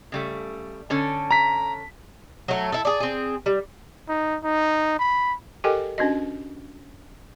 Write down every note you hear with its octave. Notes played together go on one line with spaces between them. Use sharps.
C#3 G3 A3
D3 C#4 A4
A#5 B6
F#3 A3
E4 A4
G#4 D5
C4 G#4
G3
D#4
D#4
B5
G4 A4 A#4 D#5 G5 G#5
C#4 D4 F#4 D#5